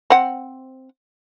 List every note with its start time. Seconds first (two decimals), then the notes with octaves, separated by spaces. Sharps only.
0.10 C4 F#5